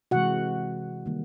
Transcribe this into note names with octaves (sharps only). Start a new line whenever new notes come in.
C3 E3 G#3 F#4 F#5
D#3 G3 A#3